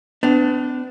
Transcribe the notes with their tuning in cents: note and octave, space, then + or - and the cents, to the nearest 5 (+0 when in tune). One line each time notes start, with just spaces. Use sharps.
B3 +40 D4 +0